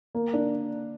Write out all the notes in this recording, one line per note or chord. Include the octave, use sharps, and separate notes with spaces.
A#3
D4